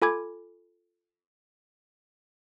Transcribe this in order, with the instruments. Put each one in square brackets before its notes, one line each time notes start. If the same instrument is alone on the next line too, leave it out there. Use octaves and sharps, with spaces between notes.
[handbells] F4 A4 G#5 B5 D6 G#6